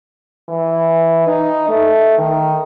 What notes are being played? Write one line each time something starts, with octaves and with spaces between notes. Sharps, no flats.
E3
D#4
A3
D#3